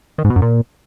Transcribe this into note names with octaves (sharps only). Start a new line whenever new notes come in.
D#3
G#2
B2
F#2
A#2